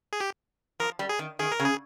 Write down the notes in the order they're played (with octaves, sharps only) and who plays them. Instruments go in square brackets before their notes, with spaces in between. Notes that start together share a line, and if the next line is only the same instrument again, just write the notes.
[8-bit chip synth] G#4
G4
[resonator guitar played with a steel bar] F3 [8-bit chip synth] A#4
[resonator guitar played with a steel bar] G3
[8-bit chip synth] G#4
[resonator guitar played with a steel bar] D#3
[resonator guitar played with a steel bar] D#3 [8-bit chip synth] G#4
[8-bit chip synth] A#4
[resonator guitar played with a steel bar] C#3
[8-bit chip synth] G#4